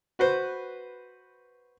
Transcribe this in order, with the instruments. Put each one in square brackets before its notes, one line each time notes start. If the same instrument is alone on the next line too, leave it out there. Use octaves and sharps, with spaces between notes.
[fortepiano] F#4 B4 C5